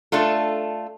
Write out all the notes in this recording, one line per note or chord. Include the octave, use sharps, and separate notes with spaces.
A3 D4 F4 A4